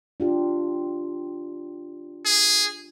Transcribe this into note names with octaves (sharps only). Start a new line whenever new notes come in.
D4 F4 G4
G#4